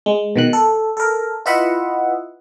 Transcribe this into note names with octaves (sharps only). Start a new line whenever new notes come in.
G#3
B2 D#3 F#6
A4
A4 A#4
E4 F4 B4 D#5 E5 F#5